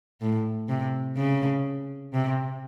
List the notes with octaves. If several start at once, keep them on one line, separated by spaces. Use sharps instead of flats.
A2
C3
C#3
C3